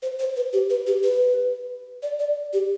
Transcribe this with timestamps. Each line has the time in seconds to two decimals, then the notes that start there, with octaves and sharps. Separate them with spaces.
0.03 C5
0.19 C5
0.36 B4
0.53 G4
0.70 B4
0.87 G4
1.03 B4
2.03 D5
2.19 D5
2.53 G4